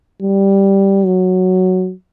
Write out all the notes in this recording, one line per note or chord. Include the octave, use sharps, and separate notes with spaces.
G3
F#3